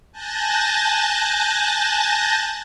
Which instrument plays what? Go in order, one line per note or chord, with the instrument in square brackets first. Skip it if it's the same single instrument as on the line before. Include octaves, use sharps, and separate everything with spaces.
[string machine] G#5 A5 F#6 G6 A6 A#6